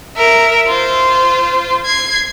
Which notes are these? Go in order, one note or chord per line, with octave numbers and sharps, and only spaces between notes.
A#4 E5
F4 C5
G#6 C7